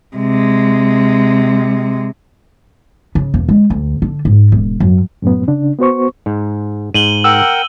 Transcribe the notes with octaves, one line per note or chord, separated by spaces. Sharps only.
C3 G#3
C#3
E1
G#3
D2
D3
G#2
E1
F#2
F#2 A2 F#3 B3
C#3 D4
B3 F#4 C5 C#6
G#2
G#2 D#7 F#7 G7
A#4 F#5 G5 E6